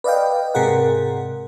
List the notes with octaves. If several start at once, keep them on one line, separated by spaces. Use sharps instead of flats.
B4 D5 D#5 F5 G5
G#2 C3 G#4 A#4 F#5